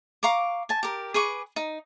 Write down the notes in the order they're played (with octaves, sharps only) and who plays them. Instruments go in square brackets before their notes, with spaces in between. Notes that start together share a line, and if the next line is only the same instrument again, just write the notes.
[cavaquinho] F5 A#5 C#6 D6
G#5 A5
G4 A#4
G#4 B4 C#6 D6
D#4